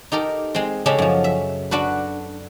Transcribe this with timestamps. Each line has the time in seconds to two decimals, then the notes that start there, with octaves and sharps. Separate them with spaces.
0.12 D#4 G4 A4 A#4
0.54 G#3 C4
0.86 C#3 G#3 C#4 G4 A4 A5
0.99 F#2 F3
1.24 E5
1.71 D4 F#4 A4 B4